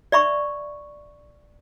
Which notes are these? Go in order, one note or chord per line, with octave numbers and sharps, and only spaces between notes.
D5 E5 B5 C#6